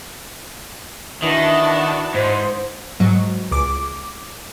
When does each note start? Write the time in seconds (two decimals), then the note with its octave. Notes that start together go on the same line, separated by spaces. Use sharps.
1.22 D#3 E3 D4 F#4 A5
2.14 G#2 C5
3.00 G#2 F#3
3.51 C#2 D6